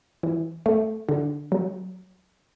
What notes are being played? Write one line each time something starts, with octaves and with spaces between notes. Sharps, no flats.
E3
A3
D3
F#3